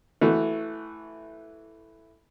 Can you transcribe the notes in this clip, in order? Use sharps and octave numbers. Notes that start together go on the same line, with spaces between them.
E3 A3 F#4